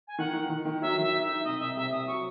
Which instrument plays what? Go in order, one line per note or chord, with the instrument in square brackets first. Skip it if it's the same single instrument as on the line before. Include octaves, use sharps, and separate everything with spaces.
[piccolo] G#5
[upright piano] D#3 [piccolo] F#5
[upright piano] D#3
D#3
D#3
[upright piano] F#3 [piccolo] E5
[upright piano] D#3 [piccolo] E5
[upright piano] D#4
[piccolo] E5
[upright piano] D#4
[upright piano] C2 [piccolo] D#5
[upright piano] C2 [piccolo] E5
[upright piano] C3 [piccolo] E5
[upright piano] C2 [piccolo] D#6
[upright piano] F#3 [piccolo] C#6